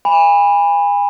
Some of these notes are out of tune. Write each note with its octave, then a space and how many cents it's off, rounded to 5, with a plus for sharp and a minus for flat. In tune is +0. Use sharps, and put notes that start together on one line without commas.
G#5 -35 B5 +0